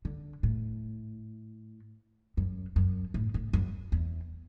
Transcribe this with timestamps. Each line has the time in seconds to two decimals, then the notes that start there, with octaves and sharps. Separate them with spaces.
0.05 D3
0.43 A2
2.37 F#2
2.76 F#2
3.14 A2
3.34 A2
3.53 F#2
3.92 E2